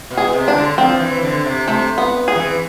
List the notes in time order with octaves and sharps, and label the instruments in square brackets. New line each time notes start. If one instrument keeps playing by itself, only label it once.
[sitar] B2
[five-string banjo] G#4
[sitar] C3
[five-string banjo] D4
[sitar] D3
[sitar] F3 [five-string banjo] C4
[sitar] E3
D3
C3
[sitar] C3 [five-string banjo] A3
[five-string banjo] B3
G#4
[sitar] E3